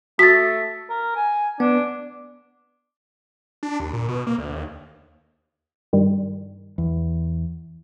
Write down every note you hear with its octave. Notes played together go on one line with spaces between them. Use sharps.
A3 F#4 A6 B6
A#4
G#5
B3 D4
D4
D#2
A#2
B2
A#3
D2
D#2
G2 D#3 G3
E2